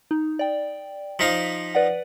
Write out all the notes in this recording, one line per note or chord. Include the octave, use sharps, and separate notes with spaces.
D#4
D5 G5
F3 D#4 F5 B6
B4 D5 F#5